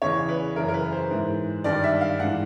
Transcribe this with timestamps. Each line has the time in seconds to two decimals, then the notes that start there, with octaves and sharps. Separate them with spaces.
0.02 E2 C#3 E3 C#5
0.29 B4
0.56 F#2 C#3 E3 A#4
0.68 A#4
0.74 B4
0.92 C5
1.11 G#2 E3
1.64 G2 D#3 D5
1.84 E5
2.01 F5
2.19 G#2 E3 F#5